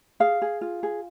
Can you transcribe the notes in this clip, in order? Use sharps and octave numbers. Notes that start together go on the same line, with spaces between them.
G#4 F5
G#4
F4
G#4